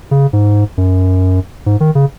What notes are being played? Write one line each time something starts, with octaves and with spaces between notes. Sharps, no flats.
C#3
G#2
F#2
G#2
D#3
C#3